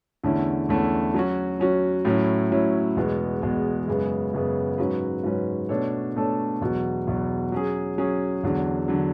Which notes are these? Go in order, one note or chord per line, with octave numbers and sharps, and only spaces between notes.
E2 D3 A3 C#4 E4
E2 D3 A3 C#4 E4
F#3 C#4 F#4
F#3 C#4 F#4
A2 F#3 C#4 E4
A2 F#3 C#4 E4
E2 B2 G#3 B3
E2 B2 G#3 B3
F#2 C#3 G#3 B3
F#2 C#3 G#3 B3
G#2 F#3 C#4 F#4 B4
G#2 F#3 C#4 F#4 B4
B2 A3 D4 A4 C#5
B2 A3 D4 A4 C#5
E2 B2 F#3
E2 B2 F#3
F#3 C#4 G#4
F#3 C#4 G#4
E2 D3 F#3
D3 F#3